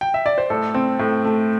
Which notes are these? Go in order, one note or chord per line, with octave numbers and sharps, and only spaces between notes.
G5
E5
D5
C5
A2 A4
C4
A2
A3